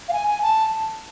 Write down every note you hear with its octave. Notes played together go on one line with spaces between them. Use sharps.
F5
G#5
G#5
A5